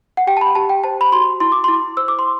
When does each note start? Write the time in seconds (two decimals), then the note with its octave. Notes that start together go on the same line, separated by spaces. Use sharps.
0.17 F#5
0.27 G4 G5
0.37 A5
0.41 B5
0.55 G4 A5
0.69 G5
0.84 C5 A5
1.01 B5
1.12 F#4 C6
1.40 E4 C6
1.52 D6
1.64 E4 C6
1.97 C5 E6
2.08 D6
2.19 C6